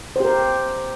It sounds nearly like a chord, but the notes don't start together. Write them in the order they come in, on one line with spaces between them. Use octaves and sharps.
C5 G4 A#4